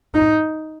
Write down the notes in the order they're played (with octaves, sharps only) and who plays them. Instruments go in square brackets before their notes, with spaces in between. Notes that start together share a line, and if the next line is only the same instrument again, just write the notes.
[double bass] D#4